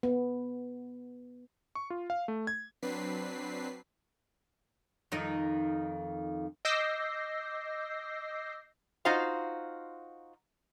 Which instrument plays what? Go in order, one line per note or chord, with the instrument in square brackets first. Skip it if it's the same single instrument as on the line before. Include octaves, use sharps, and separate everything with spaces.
[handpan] B3
[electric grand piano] C#6
F4
F5
A3
G#6
[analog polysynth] F#3 C4 D4 B4 B6 C7
[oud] F2 D#3 D#4
[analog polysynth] D#5 D6 E6 G6 A#6 C7
[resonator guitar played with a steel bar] D#4 F4 F#4 C5 F5